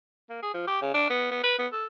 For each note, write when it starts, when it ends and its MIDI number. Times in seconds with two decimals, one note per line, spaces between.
0.29 0.41 58
0.42 0.53 68
0.54 0.64 53
0.67 0.78 67
0.81 0.94 49
0.94 1.07 62
1.10 1.27 59
1.31 1.42 59
1.44 1.55 71
1.59 1.67 59
1.72 1.86 69